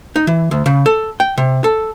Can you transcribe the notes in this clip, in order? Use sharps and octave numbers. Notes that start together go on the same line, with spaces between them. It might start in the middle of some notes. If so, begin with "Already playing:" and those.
D#4
E3
D2
C#3
A4
G5
C3
A4